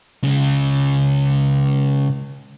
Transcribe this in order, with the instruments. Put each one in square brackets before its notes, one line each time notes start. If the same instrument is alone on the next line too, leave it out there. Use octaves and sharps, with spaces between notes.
[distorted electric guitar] C#3 G#3